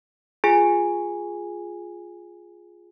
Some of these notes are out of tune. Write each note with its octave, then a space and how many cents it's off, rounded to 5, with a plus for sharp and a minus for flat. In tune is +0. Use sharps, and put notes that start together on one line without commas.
F4 +0 G#4 +0 G#5 -10